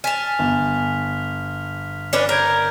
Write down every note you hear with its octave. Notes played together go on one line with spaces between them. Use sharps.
G#5 A5 F6 B6 F7
G1
C#4 D4 B4
A#4 F6 G6 G#6